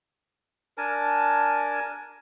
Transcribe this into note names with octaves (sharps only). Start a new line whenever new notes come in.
D4 A#4 G#5 A5